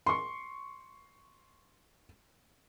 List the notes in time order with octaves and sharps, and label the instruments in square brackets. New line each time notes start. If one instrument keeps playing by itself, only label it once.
[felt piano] C6 C#6